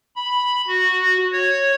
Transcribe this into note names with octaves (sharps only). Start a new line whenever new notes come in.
B5
F#4
C#5